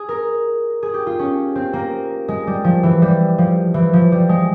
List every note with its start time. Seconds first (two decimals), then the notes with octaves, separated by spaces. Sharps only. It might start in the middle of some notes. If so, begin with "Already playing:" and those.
Already playing: G#4
0.09 A#4
0.83 G#4
0.94 G4
1.07 F4
1.19 C#4
1.55 C4
1.73 A#3
2.28 G#3
2.47 G3
2.64 F3
2.83 E3
3.02 G3
3.38 F3
3.74 E3
3.93 F3
4.12 G3
4.29 G#3